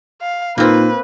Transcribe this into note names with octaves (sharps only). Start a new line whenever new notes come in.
F5
A#2 A#3 C4 D#4 B4